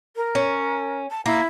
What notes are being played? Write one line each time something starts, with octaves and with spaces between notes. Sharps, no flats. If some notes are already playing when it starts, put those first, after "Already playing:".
A#4
C#4
A5
A#3 E4